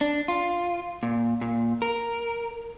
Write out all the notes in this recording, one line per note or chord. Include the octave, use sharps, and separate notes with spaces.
D4
F4
A#2
A#2
A#4